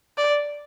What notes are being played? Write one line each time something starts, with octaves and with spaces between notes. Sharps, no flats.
D5